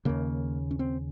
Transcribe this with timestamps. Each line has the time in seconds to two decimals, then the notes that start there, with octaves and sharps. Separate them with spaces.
0.05 D#2 C#3 A#3
0.71 C#4
0.79 C4